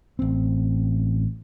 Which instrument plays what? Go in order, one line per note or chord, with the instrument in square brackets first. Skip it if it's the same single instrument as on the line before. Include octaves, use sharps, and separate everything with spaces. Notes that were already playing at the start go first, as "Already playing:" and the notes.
[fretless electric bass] A1 C4